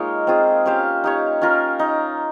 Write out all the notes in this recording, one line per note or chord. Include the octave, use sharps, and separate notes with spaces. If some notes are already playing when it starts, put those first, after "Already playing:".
Already playing: G#3 A#3 D#4 F4 A#4 C#5 D#5
C4 F4 G#4
C#4 G4 C5 F5
D#4 G4 C#5
C#4 F4 A#4
D#4